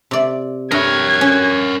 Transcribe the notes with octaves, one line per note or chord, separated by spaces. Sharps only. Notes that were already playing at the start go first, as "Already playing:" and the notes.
C3 D5
G2 A#4 C#5 G#6
C#4